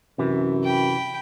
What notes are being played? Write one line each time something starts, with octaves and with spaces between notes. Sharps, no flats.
F#2 C3 E3
G5 B5